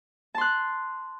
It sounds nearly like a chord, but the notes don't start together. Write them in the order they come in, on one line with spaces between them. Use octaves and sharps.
A5 C6 F#6